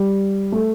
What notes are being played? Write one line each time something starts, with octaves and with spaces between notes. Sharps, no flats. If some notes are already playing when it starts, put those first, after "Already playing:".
Already playing: G3
A3